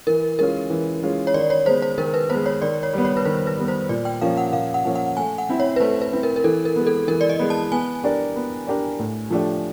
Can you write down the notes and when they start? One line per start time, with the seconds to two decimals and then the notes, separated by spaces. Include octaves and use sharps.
0.07 E3 A#4
0.39 G#3 C#4 F4 A#4
0.70 E3
1.03 G#3 C#4 F4
1.27 C#5
1.34 D#3 D5
1.50 C#5
1.66 G#3 B3 C5
1.82 C5
1.98 D#3 A#4
2.14 B4
2.30 G#3 B3 C5
2.46 C#5
2.62 D#3 D5
2.83 C#5
2.93 G3 B3
3.05 C#5
3.17 B4
3.25 D#3 C5
3.47 B4
3.57 G3 B3
3.68 C5
3.89 A#2 D5
4.05 G5
4.21 F3 A#3 C#4 F5
4.37 F#5
4.52 A#2 F5
4.74 F#5
4.85 F3 A#3 C#4
4.95 F#5
5.17 A3 G#5
5.38 F#5
5.49 C4 E4
5.60 C#5
5.76 B4
5.80 A3 C5
6.02 B4
6.13 C4 E4
6.23 A#4
6.36 A#4
6.44 E3 A4
6.65 A#4
6.76 G#3 B3
6.87 A4
7.08 E3 A#4
7.21 D5
7.30 D#5
7.39 G#3 B3
7.50 A5
7.72 B3 G#5
8.04 D4 G4 A#4 D5
8.36 B3
8.67 D4 G4 A#4 D5
8.99 A2
9.30 F3 A3 D4 G4